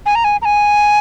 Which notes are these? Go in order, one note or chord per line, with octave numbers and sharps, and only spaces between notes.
G#5
A#5
G#5
A#5
G#5